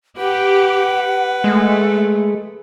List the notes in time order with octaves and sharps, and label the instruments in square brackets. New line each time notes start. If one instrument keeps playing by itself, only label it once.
[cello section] G4 [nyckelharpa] B4 [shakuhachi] F#5
[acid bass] G#3 [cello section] A3